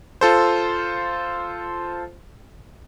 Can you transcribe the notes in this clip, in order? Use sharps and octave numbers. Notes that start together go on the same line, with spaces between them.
F4 A4 C5